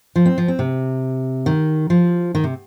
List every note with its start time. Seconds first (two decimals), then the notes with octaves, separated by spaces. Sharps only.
0.16 F3
0.26 C4
0.38 F3
0.48 C4
0.59 C3
1.46 D#3
1.90 F3
2.35 D#3
2.44 C3